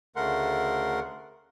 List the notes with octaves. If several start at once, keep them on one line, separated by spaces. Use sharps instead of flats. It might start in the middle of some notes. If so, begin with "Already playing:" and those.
D2 C#3 A3 A#4 F#5 C6